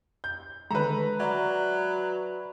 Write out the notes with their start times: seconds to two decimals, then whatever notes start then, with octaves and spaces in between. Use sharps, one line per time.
0.24 G6
0.71 D3 D#3 G#3 A3 B4 A#5
1.20 F#3 D5 E5 F#5